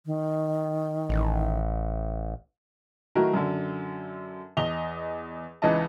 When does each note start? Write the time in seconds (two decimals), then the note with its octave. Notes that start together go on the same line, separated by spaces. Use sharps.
0.06 D#3
1.09 A1
3.15 D#3 F#3 A3 E4 F#4 A#4
3.34 F#2 D3
4.57 E2 D#5 F7 G7
5.62 C#2 E3 D#4 B4 D#5 A5